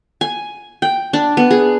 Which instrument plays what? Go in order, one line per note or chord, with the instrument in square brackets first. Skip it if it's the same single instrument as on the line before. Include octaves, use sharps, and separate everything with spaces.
[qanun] G#5
G5
D4
B3
G#4